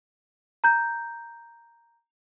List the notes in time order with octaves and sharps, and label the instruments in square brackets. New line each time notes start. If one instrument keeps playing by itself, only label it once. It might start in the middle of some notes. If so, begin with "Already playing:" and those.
[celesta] A#5 G6